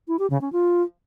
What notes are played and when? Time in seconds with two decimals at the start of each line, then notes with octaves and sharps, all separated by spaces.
0.08 E4
0.19 G4
0.30 C#3
0.41 C#4
0.52 F4